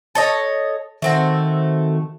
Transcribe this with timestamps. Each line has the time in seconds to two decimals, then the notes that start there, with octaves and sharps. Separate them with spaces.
0.15 A4 C#5 D#5
1.02 D#3 A3 C4 F#4